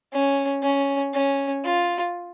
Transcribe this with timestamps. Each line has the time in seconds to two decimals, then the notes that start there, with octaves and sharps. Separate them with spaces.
0.12 C#4
0.63 C#4
1.13 C#4
1.64 F4